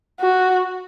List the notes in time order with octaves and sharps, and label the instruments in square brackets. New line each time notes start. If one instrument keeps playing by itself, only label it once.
[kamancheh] F#4